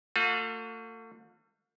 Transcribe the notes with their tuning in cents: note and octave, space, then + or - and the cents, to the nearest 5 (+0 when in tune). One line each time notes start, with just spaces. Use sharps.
A3 +40 F4 +45